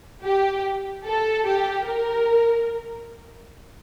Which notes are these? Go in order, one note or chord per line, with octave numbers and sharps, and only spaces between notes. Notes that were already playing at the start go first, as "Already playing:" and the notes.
G4
A4
G4
A#4